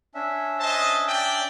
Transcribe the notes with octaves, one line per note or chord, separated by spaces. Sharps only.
C#4 D4 E5
C5 D#5 A5
D5 G5